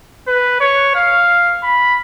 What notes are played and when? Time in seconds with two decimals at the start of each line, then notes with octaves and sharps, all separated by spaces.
0.27 B4
0.60 C#5
0.95 F5
1.63 B5